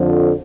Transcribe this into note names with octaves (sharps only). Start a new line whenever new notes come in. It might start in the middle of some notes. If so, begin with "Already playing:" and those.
Already playing: F2 D3 F3